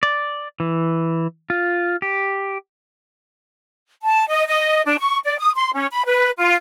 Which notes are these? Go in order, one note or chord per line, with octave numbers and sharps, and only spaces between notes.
D5
E3
F4
G4
A5
D#5
D#5
D4
C#6
D5
D#6
C6
C#4
B5
B4
F4